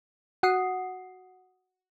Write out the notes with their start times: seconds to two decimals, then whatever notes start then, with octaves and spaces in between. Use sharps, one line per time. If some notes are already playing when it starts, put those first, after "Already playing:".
0.43 F#4 F#5 D#6 C7